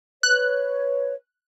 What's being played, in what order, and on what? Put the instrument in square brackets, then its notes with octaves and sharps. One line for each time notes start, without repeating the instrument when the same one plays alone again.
[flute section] B4 C#5 [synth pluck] F#6